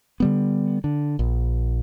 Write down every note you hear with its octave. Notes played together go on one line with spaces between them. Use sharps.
D3 G3 B3
D3
A#1